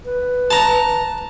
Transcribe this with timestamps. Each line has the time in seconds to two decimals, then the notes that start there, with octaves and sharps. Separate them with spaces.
0.05 B4
0.51 A5 A#5